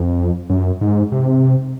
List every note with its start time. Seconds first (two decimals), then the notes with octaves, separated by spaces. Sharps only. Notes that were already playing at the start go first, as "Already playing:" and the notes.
Already playing: F2
0.50 F#2
0.81 G#2
1.12 C3